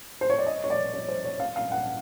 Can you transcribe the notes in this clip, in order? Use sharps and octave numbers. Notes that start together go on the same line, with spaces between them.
C5
C#5
D5
D#5
C#5
D5
C#5
C5
C#5
F5
F5
F#5